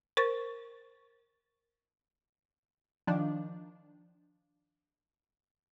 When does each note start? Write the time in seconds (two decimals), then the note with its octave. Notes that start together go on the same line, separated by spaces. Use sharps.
0.17 A#4 C5 C#6 A6
3.07 D#3 F3 D4